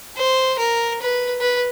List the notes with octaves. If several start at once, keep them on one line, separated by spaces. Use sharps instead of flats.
C5
A#4
B4
B4